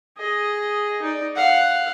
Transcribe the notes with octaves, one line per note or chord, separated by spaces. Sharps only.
G#4 D#5
D#4 D5
F5 F#5